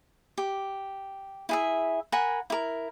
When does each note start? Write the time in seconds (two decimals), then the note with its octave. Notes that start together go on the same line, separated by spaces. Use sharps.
0.38 G4
1.49 E4 G#4 E5
2.12 A#4 F#5 G#5 B5
2.50 E4 A#4